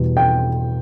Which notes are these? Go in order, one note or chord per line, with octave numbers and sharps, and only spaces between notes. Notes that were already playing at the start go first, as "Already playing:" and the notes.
Already playing: E2 B2 G3
G5